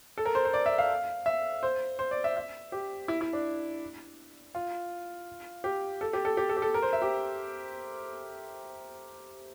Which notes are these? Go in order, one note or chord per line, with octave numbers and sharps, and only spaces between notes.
A4
A#4
C5
C5
D5
E5
F5
E5
C5
C5
D5
E5
E5
G4
E4
E4
D4
F4
G4
A4
G4
A4
G4
A4
G4
A4
A#4
C5
E5
G4